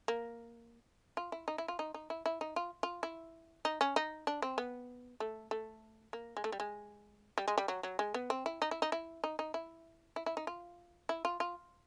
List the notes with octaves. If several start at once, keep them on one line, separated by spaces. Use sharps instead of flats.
A#3
F4
E4
D#4
E4
F4
D#4
D#4
E4
E4
D#4
F4
F4
E4
D#4
C#4
D#4
D4
C4
B3
A3
A3
A#3
G#3
A3
G3
G#3
G3
G#3
G3
F#3
F#3
G#3
B3
C4
E4
D#4
E4
D#4
E4
D#4
D#4
E4
E4
E4
D#4
F4
E4
F4
F4